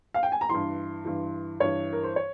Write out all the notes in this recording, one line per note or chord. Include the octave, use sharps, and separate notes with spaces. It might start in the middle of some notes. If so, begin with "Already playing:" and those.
F5
G5
G#5
A#5
G2 E3 C6
G2 E3
G2 E3 C#5
A#4
C5
C#5